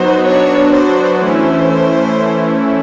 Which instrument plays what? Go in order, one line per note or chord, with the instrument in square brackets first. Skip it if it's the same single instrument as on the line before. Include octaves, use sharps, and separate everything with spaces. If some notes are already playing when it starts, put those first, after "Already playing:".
Already playing: [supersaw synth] F#3 B3 D#4 F#4 [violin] C5
[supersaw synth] F#3 B3 D4 F#4 [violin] C#5
[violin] C5
[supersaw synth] E3 A3 C#4 E4 [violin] C5